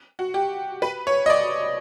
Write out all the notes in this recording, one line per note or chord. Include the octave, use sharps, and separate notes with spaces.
F#4
G4
B4
C#5
D#5
D5